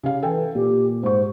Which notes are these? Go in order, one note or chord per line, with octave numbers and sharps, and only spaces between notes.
C#3 G4 F5
E3 A4 G5 G#5
A#2 G4
G#2 C5 C#6